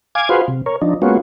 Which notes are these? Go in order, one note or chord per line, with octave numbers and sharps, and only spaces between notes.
F5 G#5 D6 G#6
F4 F#4 G#4 B4 C5 F5
C3
A#4 C#5
F3 D4 D#4
G#3 A#3 B3 C#4 F4 F#4